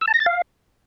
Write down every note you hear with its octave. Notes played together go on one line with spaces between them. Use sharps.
E6
A5
A#6
A6
F5